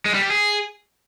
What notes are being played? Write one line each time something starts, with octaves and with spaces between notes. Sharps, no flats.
G#3
G3
G4
G#4